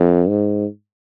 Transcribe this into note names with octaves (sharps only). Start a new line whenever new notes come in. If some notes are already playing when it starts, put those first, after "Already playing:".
Already playing: F2
G#2